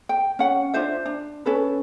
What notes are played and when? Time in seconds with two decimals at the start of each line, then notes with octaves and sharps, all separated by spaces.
0.09 G5
0.39 C#4 F#5
0.74 D4 F4 C5 E5
1.06 D4
1.46 C#4 A4 B4